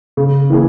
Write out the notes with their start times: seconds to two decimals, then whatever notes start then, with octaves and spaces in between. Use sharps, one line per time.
0.17 C#3
0.50 E3 A#3 E4 G#4